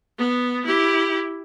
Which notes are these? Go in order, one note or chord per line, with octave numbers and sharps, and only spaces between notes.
B3
E4 G4